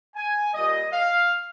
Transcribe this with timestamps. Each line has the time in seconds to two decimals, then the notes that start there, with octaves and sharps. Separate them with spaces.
0.16 G#5
0.54 A#2 G3 A#3 D#5
0.93 F5